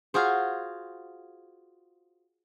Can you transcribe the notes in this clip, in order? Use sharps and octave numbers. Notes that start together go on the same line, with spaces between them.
F4 F#4 G#4 C5